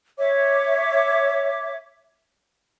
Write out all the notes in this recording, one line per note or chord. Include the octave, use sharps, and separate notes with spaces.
C#5 E5 D6